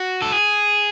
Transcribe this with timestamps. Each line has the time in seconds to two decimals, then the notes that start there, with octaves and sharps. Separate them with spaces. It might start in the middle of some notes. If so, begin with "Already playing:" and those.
Already playing: F#4
0.22 A4
0.32 G#4